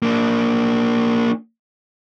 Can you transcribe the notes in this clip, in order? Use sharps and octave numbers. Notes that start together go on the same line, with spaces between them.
A#3 D4